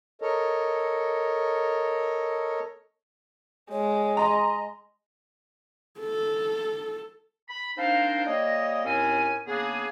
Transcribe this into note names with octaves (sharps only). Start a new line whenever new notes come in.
A4 A#4 C#5 D#5
G#3 C#5
D#5 A#5 C6
A4
B5
C4 D4 D#4 A#4 C5 F5
G3 A#3 C#5 D#5
D#2 A2 C4 C#4 G#5
C#3 A#3 B3 D4 G#4